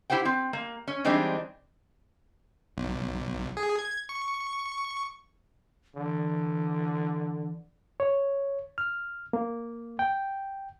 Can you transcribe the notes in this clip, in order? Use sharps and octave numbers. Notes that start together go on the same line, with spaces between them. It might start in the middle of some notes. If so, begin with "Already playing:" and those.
E4 G4 C5 F#5 G5
C4
A#3
C#4
E3 G3 G#3 C4 D4 D#4
B1
G#4
G#6
C#6
D3 E3
C#5
F6
A#3
G5